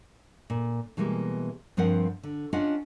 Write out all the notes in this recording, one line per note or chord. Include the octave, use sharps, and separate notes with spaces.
A#2
B2 E3 G3 G#3 A#3
G2 F3 C4 A#4 F#5
D3
C#4 D4 F4 D#5 F#5